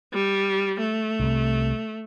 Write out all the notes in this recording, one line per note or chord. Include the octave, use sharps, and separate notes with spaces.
G3
A3
C2 C3